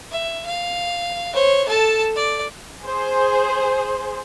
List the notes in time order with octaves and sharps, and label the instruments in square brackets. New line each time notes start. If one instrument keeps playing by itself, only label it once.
[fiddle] E5
F5
C5 C#5
A4 A5
D5
[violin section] G#4 C5